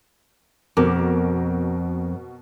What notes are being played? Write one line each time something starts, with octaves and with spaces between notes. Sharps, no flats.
F2 B2 A#4 D6